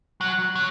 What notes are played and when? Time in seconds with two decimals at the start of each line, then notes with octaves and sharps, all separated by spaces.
0.21 F#3 F#6
0.56 F#3